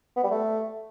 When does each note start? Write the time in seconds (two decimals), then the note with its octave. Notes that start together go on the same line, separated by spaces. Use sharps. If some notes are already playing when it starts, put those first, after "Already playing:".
0.16 B3
0.24 G3
0.31 A3